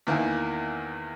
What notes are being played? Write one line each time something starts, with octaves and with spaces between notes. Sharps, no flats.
E2 D#3 A#3 E4 G#5